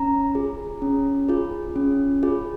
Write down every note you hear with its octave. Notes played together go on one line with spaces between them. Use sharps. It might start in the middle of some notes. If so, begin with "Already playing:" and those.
Already playing: C#4 A#5
F4 G#4
C#4
F4 G#4
C#4
F4 G#4